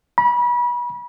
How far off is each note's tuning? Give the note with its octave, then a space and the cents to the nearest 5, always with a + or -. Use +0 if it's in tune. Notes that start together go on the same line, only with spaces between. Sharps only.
B5 -35